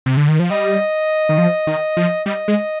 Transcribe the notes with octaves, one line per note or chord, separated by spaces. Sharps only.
C3
D3
D#3
F3
G3 D#5
D#3
F3
D#3
F3
G3 D#5
G#3